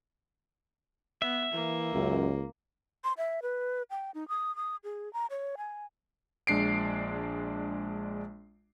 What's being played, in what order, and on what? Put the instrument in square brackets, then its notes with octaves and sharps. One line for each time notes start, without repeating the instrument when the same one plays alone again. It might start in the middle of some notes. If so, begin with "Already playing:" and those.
[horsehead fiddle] B3 [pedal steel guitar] E5
[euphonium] E3 [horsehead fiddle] A#3
[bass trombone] C#2 [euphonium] F#2
[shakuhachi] C6
E5
B4
G5
D#4
D#6
D#6
G#4
A#5
C#5
G#5
[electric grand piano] A#1 G#3 D4 C7 D7